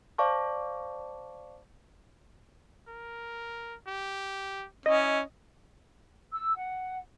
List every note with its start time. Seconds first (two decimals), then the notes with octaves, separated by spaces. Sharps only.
0.18 C5 D5 F5 A5 C#6 D6
2.89 A#4
3.88 G4
4.86 C#4 E4 D#5
6.33 E6
6.57 F#5